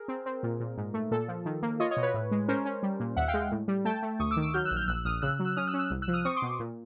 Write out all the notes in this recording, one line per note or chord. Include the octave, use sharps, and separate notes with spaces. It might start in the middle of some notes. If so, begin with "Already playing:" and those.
Already playing: G#4 A#4
C4
C4
A#2
A#2
G#2
A3
A#2 A4
F3
D#3
A#3
F4 C#5 D#5
C#5 D#5
B2
B4 C#5
A2
G#3
C#4 A#4 C5
C#4
G3
A#2
D#2 E5 F#5
F5 G5
G#3
A2
G3
A3 G5 A5
A3
D2 C#6 D#6
D6 E6
D#3
D6 E6
F#3 F6 G6
E6 F#6
A#1
F6 G6
A#1 E6 F#6
A#1 D#6 F6
C#3 E6 F#6
F#3
E6 F#6
C#4 D#6 F6
E6 F#6
C#4
E6 F#6
C2
E6 F#6
F3
D#6 F6
C4 C#6 D#6
C6 D6
B2
A#2